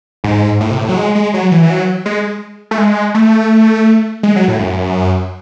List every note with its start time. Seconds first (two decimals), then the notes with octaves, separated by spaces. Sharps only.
0.24 G#2
0.61 A2
0.71 C3
0.79 A2
0.89 F#3
0.97 G#3
1.15 G#3
1.34 F#3
1.51 E3
1.63 E3
1.70 F#3
2.06 G#3
2.71 A3
2.78 G#3
3.14 A3
4.23 G#3
4.36 F#3
4.48 A2
4.59 F#2